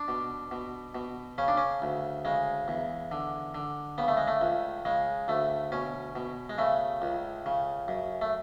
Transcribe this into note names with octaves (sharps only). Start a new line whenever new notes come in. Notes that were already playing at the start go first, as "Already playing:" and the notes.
Already playing: D4
B2
B2
B2
C#3 C#4
D4
C#4
D2
C#3 G#3
E2
D3
D3
C#3 B3
A3
G#3
A3
C#2
C#3 G#3
D2 A3
B2 C#4
B2
G#3
C#3 A3
C#2
C#3
F#2
A3